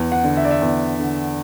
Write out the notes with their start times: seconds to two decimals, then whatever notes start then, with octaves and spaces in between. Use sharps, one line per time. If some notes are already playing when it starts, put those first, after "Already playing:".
Already playing: E2
0.12 F#5
0.24 D3
0.37 E5
0.44 D5
0.51 E5
0.62 E2
0.99 D3